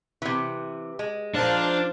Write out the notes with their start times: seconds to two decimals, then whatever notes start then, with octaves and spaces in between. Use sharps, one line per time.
0.22 C3 E3
0.99 G#3
1.34 F3 D4 D#4 F4 A#4 C5 F5